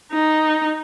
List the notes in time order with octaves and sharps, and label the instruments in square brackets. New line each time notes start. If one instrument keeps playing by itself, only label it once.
[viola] D#4